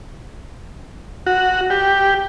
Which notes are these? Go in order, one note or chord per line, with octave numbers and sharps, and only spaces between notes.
F#4
G4